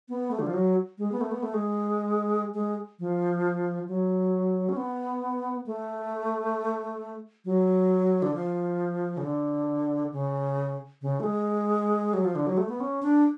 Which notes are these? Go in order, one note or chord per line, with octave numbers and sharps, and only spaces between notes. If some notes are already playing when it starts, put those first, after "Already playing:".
B3
A3
D3
F3
F#3
G#3
B3
A3
B3
A3
G#3
G#3
F3
F#3
C#4
B3
A3
F#3
D3
F3
C#3
D3
C#3
C#3
A3
G#3
F#3
F3
D3
F#3
A3
B3
C#4
D4